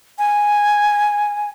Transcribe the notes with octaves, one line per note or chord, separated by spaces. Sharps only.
G#5